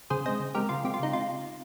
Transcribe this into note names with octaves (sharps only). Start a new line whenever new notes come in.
C#3 G#4 C5
G#3 C4 C5 D#5
C#3
G#3 C4 G4 A#4
C#3 F4
G#3 C4 G4
F4
C#3 D#4
C4 F4